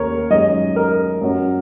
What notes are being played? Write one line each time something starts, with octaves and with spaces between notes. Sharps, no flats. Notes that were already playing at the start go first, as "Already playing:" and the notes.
Already playing: D#2 D#3 C#4 A#4 C#5
F#2 D#3 G#3 C#4 D#5
A#4
F#2 F#3 C#4